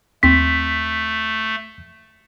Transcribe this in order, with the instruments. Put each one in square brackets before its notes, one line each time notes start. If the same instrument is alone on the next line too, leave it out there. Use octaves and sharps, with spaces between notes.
[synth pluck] D#2 C4 C6 [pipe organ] A3 [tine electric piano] B6